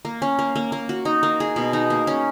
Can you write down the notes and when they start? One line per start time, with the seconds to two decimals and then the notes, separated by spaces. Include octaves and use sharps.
0.05 A#3
0.22 C#4
0.39 A#3
0.56 A#3
0.72 A#3
0.89 F#4
1.05 D#4
1.23 A#3
1.40 G#4
1.56 B2
1.73 D#4
1.90 A#3
2.07 C#4